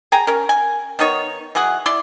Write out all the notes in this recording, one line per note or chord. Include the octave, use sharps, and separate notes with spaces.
G#4 G5 G#5 A#5
C#4 A#4
G#5
D#3 B3 D#4 C#5
E3 F#3 G#4 F#5
E4 D5 C6